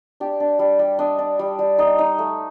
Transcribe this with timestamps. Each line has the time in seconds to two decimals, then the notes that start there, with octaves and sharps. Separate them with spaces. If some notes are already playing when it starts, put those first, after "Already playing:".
0.20 D4 G4
0.40 D4
0.59 G3
0.79 G3
0.99 D4 D#5
1.19 D4
1.39 G3
1.59 G3
1.78 D#4 D#5
1.99 D#4
2.19 A3